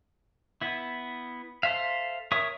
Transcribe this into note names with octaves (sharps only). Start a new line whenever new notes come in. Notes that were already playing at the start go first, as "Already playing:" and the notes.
B3 E4
A4 C5 E5 F5
A#4 C#5 E5 C#6 D#6